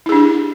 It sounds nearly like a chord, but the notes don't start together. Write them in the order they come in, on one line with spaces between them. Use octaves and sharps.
E4 G#4 D4 G4